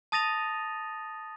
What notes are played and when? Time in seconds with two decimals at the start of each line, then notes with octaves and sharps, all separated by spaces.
0.12 A5 D#6 A6 A#6 D#7 F7